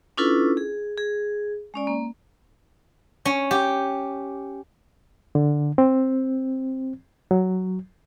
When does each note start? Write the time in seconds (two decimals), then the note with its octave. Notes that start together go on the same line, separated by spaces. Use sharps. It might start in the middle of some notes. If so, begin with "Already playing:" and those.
0.17 C#4 D4 E4 F4 A4 B4
0.57 G#4
0.97 G#4
1.74 G#3 C#4 D5
1.87 A#3
3.25 C#4
3.51 G4
5.35 D3
5.78 C4
7.31 F#3